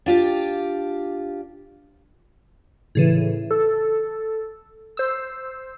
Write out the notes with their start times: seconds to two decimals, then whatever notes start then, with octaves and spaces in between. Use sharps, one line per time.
0.06 D4 F4 G4
2.95 A2 C#3 E3
3.51 A4
4.97 C5 E6